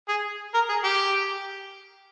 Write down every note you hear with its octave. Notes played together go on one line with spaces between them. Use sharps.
G#4
A#4
G#4
G4